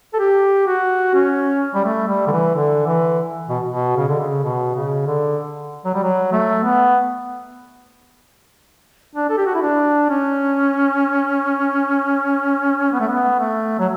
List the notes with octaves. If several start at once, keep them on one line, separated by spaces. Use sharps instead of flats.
A4
G4
F#4
C#4
G3
A3
G3
D3
E3
D3
E3
B2
B2
C#3
D3
C#3
B2
C#3
D3
F#3
G3
F#3
A3
B3
D4
A4
G4
F#4
E4
D4
C#4
B3
A3
B3
A3
F#3